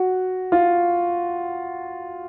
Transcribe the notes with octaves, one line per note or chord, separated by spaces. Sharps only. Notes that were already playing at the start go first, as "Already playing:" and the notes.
Already playing: F#4
F4